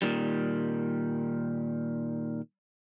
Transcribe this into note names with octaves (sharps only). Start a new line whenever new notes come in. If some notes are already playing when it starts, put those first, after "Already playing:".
A#2 D#3 G3